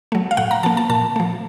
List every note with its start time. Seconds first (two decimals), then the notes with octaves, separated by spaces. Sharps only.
0.12 F#3 A3
0.31 F5
0.37 A2 F#5
0.51 A#5
0.63 F3 A#3 A5
0.77 A5
0.90 A#2 A5
1.16 F3 A3